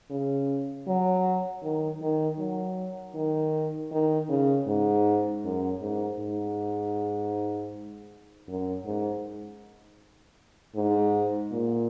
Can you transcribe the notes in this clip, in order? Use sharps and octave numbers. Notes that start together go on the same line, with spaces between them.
C#3
F#3
D#3
D#3
F#3
D#3
D#3
C#3
G#2
F#2
G#2
G#2
F#2
G#2
G#2
A#2